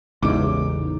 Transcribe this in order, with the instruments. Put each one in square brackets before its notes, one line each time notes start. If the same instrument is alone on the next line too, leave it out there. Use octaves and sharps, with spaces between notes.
[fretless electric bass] A1 E2 [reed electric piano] C#3 [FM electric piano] G#3 B3 D#4 [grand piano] D6